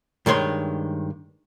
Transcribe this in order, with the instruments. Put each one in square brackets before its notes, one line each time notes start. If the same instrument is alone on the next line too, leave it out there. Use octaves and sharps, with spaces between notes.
[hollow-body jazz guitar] G2 D#3 G#3 C#5 C6